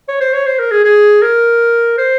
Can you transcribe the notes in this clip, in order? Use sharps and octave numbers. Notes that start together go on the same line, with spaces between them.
C#5
C5
C#5
C5
A#4
G#4
G#4
A#4
C5